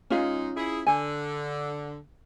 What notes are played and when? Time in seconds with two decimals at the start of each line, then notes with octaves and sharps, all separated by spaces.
0.10 G#3 C#4 D#4 F4 F5
0.56 E4 G#4
0.87 D3 G#5